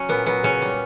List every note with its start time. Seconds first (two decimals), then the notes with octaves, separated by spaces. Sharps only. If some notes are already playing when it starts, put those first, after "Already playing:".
Already playing: F#3 C#4
0.09 A#2 B3
0.26 F#3 B3
0.43 C#3 C#4
0.62 G3